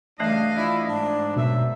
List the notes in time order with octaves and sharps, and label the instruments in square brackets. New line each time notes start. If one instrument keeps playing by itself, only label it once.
[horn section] G2 C#3 D4 [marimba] E3 A3 F#6 [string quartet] D#5 F5
[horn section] F3 D4 E4
[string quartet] G#2 [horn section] D4
[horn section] F#2 E5 [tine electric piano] B2